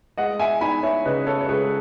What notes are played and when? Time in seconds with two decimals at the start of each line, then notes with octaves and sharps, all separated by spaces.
0.18 G#3 D#5 F#5
0.39 E5 G#5
0.61 D#4 G#5 B5
0.83 C#5 E5
1.05 C#3 B4 D#5
1.27 A4 C#5
1.41 C#5
1.49 C#2 G#4 B4